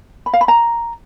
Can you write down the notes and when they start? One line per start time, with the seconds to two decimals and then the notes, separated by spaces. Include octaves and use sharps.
0.26 B5
0.34 F5
0.41 B5
0.48 A#5